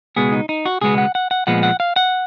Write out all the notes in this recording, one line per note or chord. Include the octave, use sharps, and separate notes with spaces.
C#2 B2 G#3 B3 G#4
D#4
D#4
F#4
C#2 B2 G#3 B3 G#4
F#5
F#5
F#5
A#2 F3 G#3 B3 F#5
F#5
F5
F#5